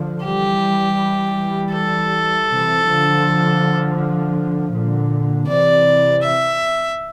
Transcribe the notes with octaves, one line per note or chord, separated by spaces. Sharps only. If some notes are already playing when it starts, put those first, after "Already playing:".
Already playing: D3 F3
E3 G3 G4
A4
C3 E3
D3 F3
A#2 D3
C3 E3 D5
E5